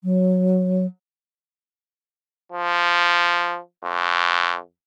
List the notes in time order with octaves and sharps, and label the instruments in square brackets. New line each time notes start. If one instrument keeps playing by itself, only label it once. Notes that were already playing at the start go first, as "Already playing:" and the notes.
[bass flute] F#3
[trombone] F3
F2